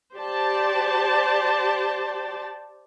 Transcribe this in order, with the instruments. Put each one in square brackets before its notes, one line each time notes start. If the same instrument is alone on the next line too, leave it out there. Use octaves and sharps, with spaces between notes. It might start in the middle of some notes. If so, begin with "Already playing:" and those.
[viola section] G4 C5 D5 A5